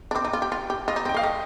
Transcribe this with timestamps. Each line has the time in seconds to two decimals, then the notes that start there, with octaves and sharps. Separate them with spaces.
0.11 D4
0.15 C4 D6
0.25 D#4
0.33 F4
0.42 G4
0.52 F4
0.70 G4
0.88 F4 D#5
0.96 D#4
1.05 C4
1.09 G5
1.14 A#3 F5
1.23 A3 D#5